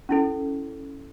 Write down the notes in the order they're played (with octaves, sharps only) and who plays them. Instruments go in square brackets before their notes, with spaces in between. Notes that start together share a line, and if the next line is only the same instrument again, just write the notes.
[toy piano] C#4 E4 A4